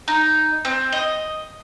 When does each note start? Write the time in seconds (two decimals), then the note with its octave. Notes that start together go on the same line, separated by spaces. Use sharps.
0.08 D#4
0.65 C4
0.92 D#5